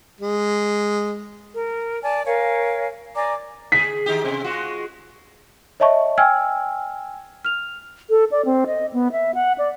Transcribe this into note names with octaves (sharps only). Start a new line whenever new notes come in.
G#3
A#4
D5 G#5 A5
A#4 C#5 F5 G#5
D5 G#5 A#5 D6
D3 G#4 B6
D#3 D#4 G4
C3 C4
G#3 F4 F#4
C#5 D#5 E5 A5 C#6
G5 G#5 E6 F6 G#6
F6 F7
A4
D5
C4
D#5
B3
E5
F#5
D5